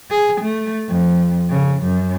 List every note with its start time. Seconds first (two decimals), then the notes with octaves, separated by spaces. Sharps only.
0.11 G#4
0.41 A3
0.88 F2
1.50 C#3
1.82 F#2